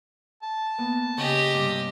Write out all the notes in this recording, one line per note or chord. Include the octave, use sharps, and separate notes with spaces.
A5
A#3 B3
C#3 G4 D#5 G5
G2 C3 G3